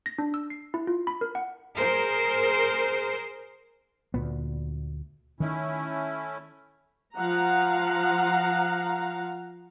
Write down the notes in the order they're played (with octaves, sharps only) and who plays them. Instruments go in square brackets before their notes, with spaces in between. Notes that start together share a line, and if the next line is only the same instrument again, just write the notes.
[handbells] A#6
D4
E6
C7
E4
F4
B5
A#4
F#5
[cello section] G#4 A#4 C5
[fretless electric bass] D2 A#2 B3
[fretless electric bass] D#3 [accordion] A3 C#4 E4
[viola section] F3 F5 F#5 A#5